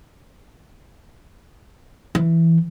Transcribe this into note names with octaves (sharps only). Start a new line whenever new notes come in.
E3